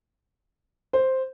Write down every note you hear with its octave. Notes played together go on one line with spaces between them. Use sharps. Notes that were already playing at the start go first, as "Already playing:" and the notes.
C5